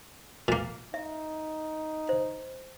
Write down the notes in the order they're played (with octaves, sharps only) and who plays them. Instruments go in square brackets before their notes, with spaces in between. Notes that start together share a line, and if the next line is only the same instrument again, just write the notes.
[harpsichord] A#2 A#3
[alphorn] D#4 [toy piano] E5
[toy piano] C5